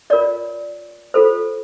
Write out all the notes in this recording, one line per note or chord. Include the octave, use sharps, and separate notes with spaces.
F4 A#4 C#5 D5
F4 A4 C5